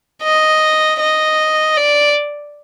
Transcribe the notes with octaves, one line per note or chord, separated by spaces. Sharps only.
D#5
D#5
D5